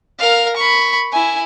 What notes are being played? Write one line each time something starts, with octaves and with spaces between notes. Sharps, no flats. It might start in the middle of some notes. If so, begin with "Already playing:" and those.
A#4 F5
B5 C#6
E4 G#5